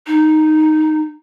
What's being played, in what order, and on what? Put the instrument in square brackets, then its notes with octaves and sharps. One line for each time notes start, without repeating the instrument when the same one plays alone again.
[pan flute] D#4